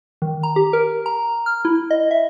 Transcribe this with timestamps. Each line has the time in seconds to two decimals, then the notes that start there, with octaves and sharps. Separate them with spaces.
0.22 D#3
0.43 A#5
0.56 G4
0.73 A#4
1.06 A#5
1.46 F6
1.65 E4
1.91 D#5
2.11 E5